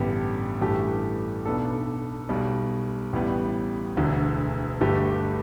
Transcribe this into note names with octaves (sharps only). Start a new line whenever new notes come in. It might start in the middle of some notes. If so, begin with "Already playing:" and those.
Already playing: A1 G2 D3 B3 G4
A1 G2 E3 A3 G4
B1 B2 B3 D4 A4
B1 B2 G3
A1 A2 G3 B3
E1 D2 D3
G1 G2 D3 A3 G4